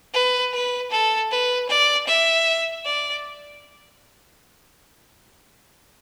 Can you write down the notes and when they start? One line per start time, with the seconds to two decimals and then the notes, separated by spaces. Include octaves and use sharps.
0.14 B4
0.53 B4
0.91 A4
1.31 B4
1.69 D5
2.07 E5
2.85 D5